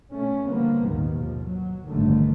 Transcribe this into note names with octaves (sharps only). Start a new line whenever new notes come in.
B2 A3 C#4
D3 F3 G3 A#3 B3
G#1 D#2 A#2 D#3
B2 F3
F#3
A1 G2 A#2 D3 D#3 A3